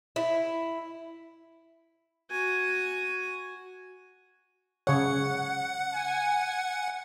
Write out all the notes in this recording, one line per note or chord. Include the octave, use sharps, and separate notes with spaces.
E4
F#4 G#5
C#3 C#5 F#5
G#5